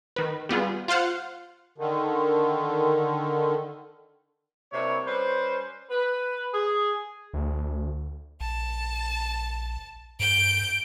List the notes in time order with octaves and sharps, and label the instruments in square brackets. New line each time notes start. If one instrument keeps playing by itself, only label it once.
[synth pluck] D#3 B4
G3 B3 F4 G#4
F4 C5 F5 F#5
[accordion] D3 D#3
[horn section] C3 G3 A#3 D4 E4 C#5
G3 C#4 B4 C5
B4
G#4
[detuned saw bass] D2
[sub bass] A#1 [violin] A5
[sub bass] G2 [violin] G6 D7